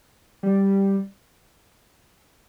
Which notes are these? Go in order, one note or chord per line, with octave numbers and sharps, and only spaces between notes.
G3